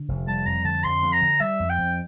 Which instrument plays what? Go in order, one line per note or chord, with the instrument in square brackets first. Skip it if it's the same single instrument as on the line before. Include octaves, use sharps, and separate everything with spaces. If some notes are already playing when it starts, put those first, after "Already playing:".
Already playing: [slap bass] D3
F1
[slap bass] G3 [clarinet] A5
[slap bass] F2 [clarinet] A#5
[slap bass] D3 [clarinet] A5
[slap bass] F2 [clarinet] C6
[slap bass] F2
[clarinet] A#5
[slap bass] D3
[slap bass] G3 [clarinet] E5
[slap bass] F2
[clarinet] G5
[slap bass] F2